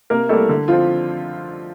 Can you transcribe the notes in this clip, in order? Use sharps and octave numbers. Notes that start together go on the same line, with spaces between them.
C3 A#3 A#4
G3 A3 A#3 A4
D3
F3 C4 F4